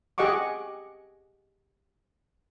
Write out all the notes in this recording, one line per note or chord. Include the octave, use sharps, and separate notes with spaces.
G4 G#4 D#5 F#5 C#6 D6